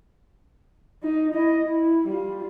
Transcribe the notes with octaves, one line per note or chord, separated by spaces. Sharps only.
D#4
E4 D#5
E4
G3 F4